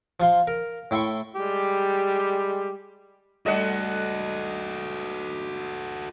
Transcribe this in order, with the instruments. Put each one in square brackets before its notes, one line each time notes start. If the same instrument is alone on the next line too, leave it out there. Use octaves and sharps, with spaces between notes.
[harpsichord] F3 F4 C6
A#4
A2 E4 G5 C6 C#6
[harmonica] G3 G#3 G4
[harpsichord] G3 A3 D4 [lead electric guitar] F#4 A4 [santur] D#5 F#5